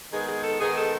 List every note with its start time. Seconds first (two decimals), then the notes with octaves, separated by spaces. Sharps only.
0.12 D#3 G#3 B3 D#4 G#4
0.28 G#4
0.44 A4
0.60 D#3 G#3 B3 D#4 G#4
0.76 A4